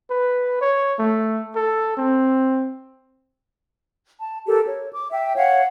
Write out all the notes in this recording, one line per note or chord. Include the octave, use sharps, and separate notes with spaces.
B4
C#5
A3
A4
C4
A5
G4 A4 A#4
C#5
D6
E5 G5
C#5 F5 F#5